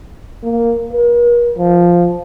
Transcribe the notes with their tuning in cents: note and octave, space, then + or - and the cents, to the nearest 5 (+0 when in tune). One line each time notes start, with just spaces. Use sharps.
A#3 +0
A#4 +40
F3 +0